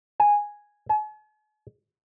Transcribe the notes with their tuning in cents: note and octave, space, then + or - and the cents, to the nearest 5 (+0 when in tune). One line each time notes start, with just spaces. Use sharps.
G#5 -5
G#5 +45